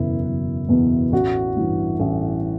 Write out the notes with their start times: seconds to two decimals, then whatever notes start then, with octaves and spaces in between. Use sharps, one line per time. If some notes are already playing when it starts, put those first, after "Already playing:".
Already playing: F#1 E2 B2 E4
0.25 F#1
0.69 E2 B2
1.12 A1 F#4
1.56 G2 E3
2.00 A1